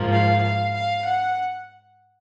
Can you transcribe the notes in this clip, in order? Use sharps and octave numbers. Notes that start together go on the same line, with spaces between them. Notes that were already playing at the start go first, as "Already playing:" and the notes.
Already playing: G#2 F3 A#3
F5
F5
F5
F#5